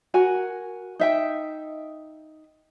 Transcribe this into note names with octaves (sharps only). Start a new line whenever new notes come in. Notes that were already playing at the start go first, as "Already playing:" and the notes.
F#4 A#4 G#5
D#4 E5 G5